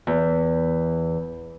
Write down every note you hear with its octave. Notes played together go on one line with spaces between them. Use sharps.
E2